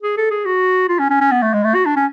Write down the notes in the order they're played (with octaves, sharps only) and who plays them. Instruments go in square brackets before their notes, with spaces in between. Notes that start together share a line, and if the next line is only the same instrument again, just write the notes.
[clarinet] G#4
A4
G#4
F#4
F4
C#4
C#4
C#4
B3
A3
G#3
A3
F#4
D4
C#4